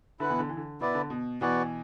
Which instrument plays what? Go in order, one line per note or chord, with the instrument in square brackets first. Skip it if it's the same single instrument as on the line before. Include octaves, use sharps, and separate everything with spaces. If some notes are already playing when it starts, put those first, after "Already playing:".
[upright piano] D3 [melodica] E4 B4 F#5
[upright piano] B2 E3
D3
E3
D3
[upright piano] B2 [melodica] B3 E4 D5
[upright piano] D3
B2
[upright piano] B2 E3 [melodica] B3 F#4 D5 F#5